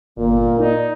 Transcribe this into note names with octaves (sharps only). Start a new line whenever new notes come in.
G1 A#2 A#3
D#4 D5